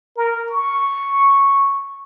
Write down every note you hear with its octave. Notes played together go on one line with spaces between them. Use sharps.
A#4
C#6